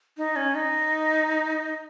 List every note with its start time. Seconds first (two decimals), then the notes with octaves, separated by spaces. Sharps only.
0.17 D#4
0.36 C#4
0.55 D#4